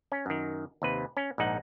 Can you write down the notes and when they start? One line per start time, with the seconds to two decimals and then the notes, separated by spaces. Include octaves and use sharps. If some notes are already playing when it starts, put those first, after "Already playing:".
0.12 C#4
0.26 F#2 D#3
0.82 D#2 C3 B4
1.17 C#4
1.38 A#1 G#2 D#4 F#5